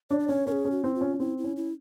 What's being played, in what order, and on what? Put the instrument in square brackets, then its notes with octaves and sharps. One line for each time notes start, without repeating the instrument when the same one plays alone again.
[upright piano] D4 [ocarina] C#5
[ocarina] D5
[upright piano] C#4 [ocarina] C#5
[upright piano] C#4 [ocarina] A#4
[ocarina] G#4
[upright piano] C#4
[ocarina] F#4
[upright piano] C4 [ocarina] E4
[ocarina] F4
[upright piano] C#4
C#4
[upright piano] C4 [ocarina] E4
[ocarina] E4
[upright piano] C#4
[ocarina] E4